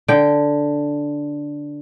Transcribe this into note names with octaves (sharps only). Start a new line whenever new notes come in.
D3 G5